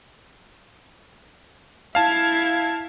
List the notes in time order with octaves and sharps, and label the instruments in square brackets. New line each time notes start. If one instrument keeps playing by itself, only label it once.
[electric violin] E4 G#6 [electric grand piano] F5 A5